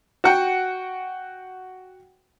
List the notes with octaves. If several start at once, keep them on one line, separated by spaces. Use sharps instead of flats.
F#4 F#5 G5